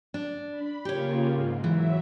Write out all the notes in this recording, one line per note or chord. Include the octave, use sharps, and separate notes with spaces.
D4
B5
C#3 A#3 F4 G4 C#5
G#2
E3 F#3 E5